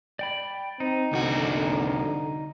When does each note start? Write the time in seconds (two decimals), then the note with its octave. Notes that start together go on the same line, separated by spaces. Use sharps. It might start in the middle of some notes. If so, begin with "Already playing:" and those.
0.19 D5 G5 B5
0.80 C4 D#4
1.13 C2 D3 F#4